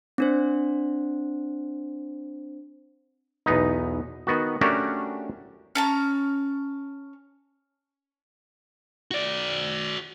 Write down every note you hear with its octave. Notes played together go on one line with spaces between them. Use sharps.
C4 D4 C5
B1 E2 B3 D#4
D#3 B3 F#4
A3 C#4 D4 F#4 G4 A#4
C#4 A5 A#5
F#4 D5